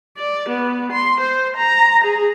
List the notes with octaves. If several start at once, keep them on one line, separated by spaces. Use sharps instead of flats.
D5
B3
C6
C5
A#5
G#4